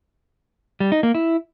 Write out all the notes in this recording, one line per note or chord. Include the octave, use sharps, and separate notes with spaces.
G3
D#4
A#3
E4